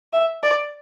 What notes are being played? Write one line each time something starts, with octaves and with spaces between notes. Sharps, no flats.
E5
D5